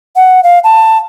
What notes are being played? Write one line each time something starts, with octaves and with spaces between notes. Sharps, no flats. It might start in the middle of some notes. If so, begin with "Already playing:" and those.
F#5
F5
A5